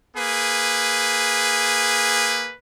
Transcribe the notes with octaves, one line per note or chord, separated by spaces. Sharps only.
A#3 G#4 B4